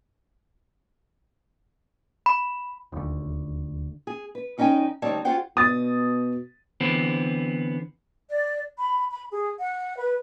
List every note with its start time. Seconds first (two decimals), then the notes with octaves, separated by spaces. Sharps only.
2.26 B5
2.92 D#1 D2
4.07 G#4
4.35 B4
4.58 E2 C#4 D#4 D#5 G5 G#5
5.02 D2 G3 C4 D#4 C#5 A5
5.25 F4 F#4 G#4 C5 F#5 G5
5.57 B2 D#6 A6
6.81 D3 E3 B3 C4
8.29 D5
8.78 B5
9.10 B5
9.30 G#4
9.59 F#5
9.96 B4